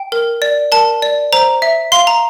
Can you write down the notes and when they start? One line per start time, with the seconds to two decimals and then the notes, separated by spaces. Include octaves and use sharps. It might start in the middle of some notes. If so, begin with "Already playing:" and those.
Already playing: G5
0.12 A#4
0.42 D5
0.72 A#4 A5
1.02 D5
1.33 C5 A#5
1.62 E5
1.92 F5 C6
2.07 A#5